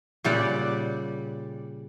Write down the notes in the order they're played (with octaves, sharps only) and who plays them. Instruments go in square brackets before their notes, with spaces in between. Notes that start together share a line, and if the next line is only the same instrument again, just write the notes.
[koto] A#2 C#3 G3 G4 D5 F#5